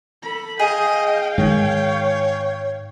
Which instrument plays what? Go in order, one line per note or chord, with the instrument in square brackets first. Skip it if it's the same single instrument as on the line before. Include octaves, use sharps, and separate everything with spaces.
[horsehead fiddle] A4 B5
[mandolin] G#4 [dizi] D#5 [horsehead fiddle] F5 G5
[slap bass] G#2 D#3 G#3 [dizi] C#5